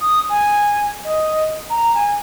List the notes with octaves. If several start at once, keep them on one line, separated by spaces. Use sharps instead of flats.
D#6
G#5
D#5
A#5
G#5